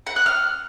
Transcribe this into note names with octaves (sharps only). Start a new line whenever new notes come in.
F#5
F#6
F6